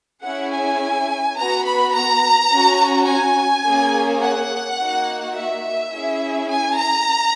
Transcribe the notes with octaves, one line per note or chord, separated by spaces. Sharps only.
C#4 E4 G#4 F#5
G#5
B3 F#4 A#5
B5
A#5
C#4 F#4
G#5
A#3 C#4 G#4
F#5
A#3 D#4 F#4
E5
C#4 E4 G#4
G#5
A#5